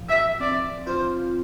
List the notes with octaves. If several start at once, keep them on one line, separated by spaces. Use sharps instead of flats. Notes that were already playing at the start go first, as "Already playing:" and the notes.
Already playing: A2 F3
E5
C4 D5
F4 C5